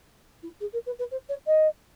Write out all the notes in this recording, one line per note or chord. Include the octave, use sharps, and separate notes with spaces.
E4
G#4
A#4
B4
B4
C5
C#5
D#5